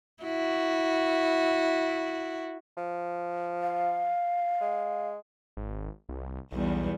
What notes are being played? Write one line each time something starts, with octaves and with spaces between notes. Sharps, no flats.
E4 F#4
F3
F5
G#3
G#1
C2
B1 E2 G3